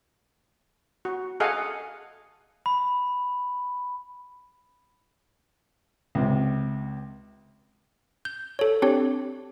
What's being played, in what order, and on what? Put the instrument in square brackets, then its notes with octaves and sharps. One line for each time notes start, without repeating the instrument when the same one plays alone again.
[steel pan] F#4
G#4 A4 D#5 F5 F#5 G#5
[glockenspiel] B5
[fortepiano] C#2 C3
[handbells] G6
A4 C#5
C4 D4 G4 C#5